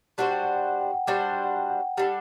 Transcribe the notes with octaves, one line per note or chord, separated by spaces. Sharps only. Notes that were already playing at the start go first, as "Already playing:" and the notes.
G3 D4 F#4 C5 F#5
G5
F#5
G5
F#5
G5
F#5
G3 D4 F#4 C5 G5
F#5
G5
F#5
G5
F#5
G3 D4 A4 F#5